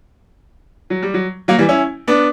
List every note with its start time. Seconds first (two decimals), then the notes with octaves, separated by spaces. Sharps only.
0.90 F#3
1.03 G3
1.14 F#3
1.48 F#3 A#3
1.58 E3 G3
1.69 C#4 E4
2.08 B3 D4